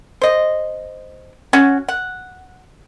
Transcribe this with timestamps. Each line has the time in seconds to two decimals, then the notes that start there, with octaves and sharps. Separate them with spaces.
0.22 C5 D#5
1.53 C#4 F#4
1.89 F#5